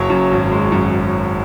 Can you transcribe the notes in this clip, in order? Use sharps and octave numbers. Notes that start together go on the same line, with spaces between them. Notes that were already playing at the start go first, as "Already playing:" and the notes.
Already playing: F#1 F#3 C#5
F#2
G#1
G#3
F#2